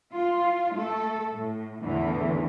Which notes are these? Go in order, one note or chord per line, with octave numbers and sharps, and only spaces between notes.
F4
A3 A4
A2
E2 A2 D3 E3